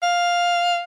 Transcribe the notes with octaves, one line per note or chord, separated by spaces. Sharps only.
F5